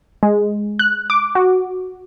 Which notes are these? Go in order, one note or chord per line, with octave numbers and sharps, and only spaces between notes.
G#3
F#6
D6
F#4